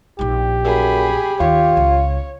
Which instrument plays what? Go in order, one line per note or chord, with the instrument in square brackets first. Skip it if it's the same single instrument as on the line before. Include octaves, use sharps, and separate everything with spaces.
[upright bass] A#1 D#4 [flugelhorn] G4
[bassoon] F#2 [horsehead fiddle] G#4 B5
[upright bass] D#2 [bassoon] F4 [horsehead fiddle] C#5
[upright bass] C#2